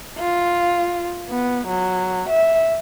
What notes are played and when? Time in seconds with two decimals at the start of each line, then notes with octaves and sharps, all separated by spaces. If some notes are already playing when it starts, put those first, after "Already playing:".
0.19 F4
1.29 B3
1.67 F#3
2.29 E5